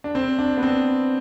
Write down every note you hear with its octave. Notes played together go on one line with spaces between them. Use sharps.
D4
C4
D4
B3
C4